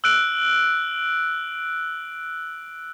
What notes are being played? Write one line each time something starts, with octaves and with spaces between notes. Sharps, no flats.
E6 F#6 D7 F#7